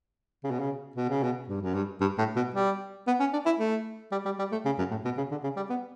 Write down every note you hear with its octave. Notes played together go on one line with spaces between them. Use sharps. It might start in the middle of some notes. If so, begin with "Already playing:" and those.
C#3
B2
C#3
B2
C#3
B2
G2
F#2
G2
G2
A2
B2
G3
B3
C#4
D4
E4
A3
G3
G3
G3
A3
C#3
F#2
A2
B2
C#3
D3
C#3
G3
B3